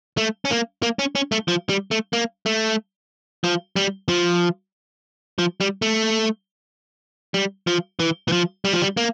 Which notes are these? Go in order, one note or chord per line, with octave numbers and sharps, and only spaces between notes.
A3
C#4
A#3
A#3
C#4
C#4
A3
F3
G3
A3
A#3
A3
F3
G3
F3
F3
G3
A3
G3
F3
E3
E3
F3
G3
F3
G3
A#3